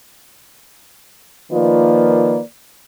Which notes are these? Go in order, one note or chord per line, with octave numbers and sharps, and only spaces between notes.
D#3 F3 A#3 F4 B4 D5